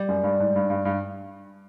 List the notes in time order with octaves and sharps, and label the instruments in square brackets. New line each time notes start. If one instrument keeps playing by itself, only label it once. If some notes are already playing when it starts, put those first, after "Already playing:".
Already playing: [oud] G3
[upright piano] F#2
G2
G#2
G2
G2
G2